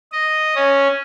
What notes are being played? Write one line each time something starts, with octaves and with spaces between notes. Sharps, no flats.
D#5
C#4